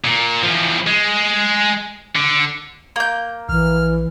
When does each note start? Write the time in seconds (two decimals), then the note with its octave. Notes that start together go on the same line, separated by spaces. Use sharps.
0.05 A#2
0.43 E2 F3
0.87 G#3
2.16 D3
2.96 A#3 G6
3.49 A#1 E3 F6